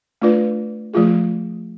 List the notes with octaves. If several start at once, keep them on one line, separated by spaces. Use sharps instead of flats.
A3 D4 F4 B4 D5
F3 A3 F4 G#4